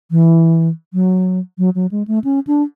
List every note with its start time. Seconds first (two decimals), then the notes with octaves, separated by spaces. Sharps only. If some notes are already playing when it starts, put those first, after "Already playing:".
0.11 E3
0.93 F#3
1.58 F#3
1.75 F#3
1.91 G#3
2.08 A3
2.24 C#4
2.47 D4